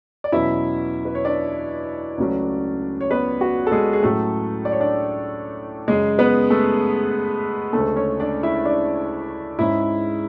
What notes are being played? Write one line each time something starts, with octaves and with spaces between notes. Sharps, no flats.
D5
E2 B2 F#3 C#4 E4 E5
B4
C#5
D4 D5
C#2 C#3 F#3 A3 C#4
C#5
B3 B4
F#4
A4
G#3 G#4
G#4
A2 F#3 A3 C#4 A4
D5
C#5
D4 D5
F#2 C#3 G#3 C#4 G#4
B3 B4
A3 A4
D2 C#3 G#3 A3 C#4 A4
C#4 C#5
D4 D5
E4 E5
D4 D5
G#2 G#3 C#4 E4 E5